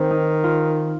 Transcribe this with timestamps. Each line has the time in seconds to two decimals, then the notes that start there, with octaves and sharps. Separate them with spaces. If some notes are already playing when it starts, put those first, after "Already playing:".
Already playing: D#3 C4
0.10 D#4
0.44 F4